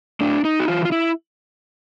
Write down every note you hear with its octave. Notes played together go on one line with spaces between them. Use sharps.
A2 D4
D#4
F#4
E3 F4
F4
E4